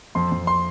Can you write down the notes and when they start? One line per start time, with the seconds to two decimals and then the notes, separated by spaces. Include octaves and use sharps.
0.15 F2 C6
0.32 F2
0.47 C6